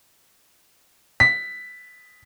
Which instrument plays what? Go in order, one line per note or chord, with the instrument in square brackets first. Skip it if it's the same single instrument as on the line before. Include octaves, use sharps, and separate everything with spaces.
[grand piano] B6